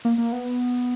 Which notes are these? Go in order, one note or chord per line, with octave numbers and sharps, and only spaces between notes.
A#3
A#3
B3